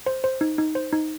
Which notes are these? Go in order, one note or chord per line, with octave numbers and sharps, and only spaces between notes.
C5
C5
D#4
D#4
C5
D#4